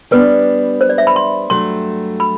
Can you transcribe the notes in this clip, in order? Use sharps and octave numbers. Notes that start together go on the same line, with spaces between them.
G3 B3 D4 B4
C5
D5
E5
B5
C6
G2 F#3 A3 C6
B5